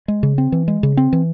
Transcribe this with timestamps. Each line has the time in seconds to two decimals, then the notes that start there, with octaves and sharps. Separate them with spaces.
0.08 G#3
0.23 C#3
0.38 C4
0.52 E3
0.68 G#3
0.83 C#3
0.97 C4
1.13 E3